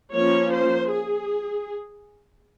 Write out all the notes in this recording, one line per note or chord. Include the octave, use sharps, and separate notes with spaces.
F3 A#3 C#4 C#5
C5
G#4